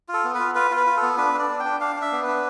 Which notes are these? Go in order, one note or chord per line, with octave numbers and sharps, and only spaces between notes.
F4 A4
B3
F4 B4
F4 B4
F4
B4
F4
A4
B3
D4 B4
D4
D5
D4
G5
D4
D4 F5
D4
E5
B3
D4 B4